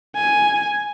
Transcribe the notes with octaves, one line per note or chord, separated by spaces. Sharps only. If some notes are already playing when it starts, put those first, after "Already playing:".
G#5